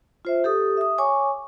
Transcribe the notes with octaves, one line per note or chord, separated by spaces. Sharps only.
F4 C5 E5
G4 A4 D#6
E5 D#6
C#5 G#5 C#6 D6